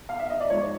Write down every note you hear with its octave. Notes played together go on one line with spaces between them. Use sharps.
F5
E5
D#5
D5
G#2 F3 C#5